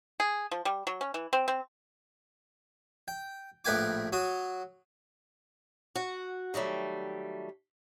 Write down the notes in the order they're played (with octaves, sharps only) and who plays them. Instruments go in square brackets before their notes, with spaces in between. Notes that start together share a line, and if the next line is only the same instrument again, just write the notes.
[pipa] G#4
F3
G3
F#3
C#4
E3
C4
C4
[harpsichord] G5
A#1 A2 B4 G5 G#5 D6
F#3 F#4 D#6
[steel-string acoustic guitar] F#4 F#5
D#3 F#3 G3 A3